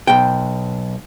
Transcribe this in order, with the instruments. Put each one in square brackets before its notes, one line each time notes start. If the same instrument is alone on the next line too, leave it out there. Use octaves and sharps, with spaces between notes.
[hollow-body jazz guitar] B1 G5